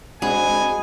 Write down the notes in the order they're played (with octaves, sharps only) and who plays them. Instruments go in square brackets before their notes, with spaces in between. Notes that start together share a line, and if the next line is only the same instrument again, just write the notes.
[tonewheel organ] G#3 C4 D4 [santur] F#4 D#5 B5 [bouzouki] G#4 [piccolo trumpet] G#5